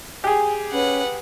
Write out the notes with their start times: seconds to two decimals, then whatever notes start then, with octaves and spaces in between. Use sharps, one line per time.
0.24 G4 G#4 G#5
0.72 C#4 B4 F#5